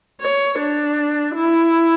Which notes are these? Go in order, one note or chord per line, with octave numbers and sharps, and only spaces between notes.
C#5
D4
E4